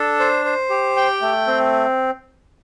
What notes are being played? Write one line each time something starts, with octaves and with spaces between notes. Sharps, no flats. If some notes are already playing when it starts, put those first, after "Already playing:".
Already playing: D4 A4
C5
C5
G4
G5
A3
C4